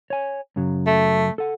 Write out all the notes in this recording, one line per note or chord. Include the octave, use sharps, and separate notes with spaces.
C#5 G#5
F#2 C#3 F#3
A3
A4 F#5